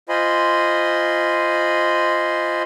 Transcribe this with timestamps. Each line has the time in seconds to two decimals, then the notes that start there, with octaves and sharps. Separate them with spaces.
0.09 F4 C5 D#5 G#5 B5 C6